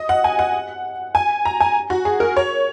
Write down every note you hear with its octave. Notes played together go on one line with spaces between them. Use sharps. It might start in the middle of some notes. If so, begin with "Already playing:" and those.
Already playing: D#5
F#5
G#5
F#5
G#5
A#5
G#5
F#4
G#4
A#4
C#5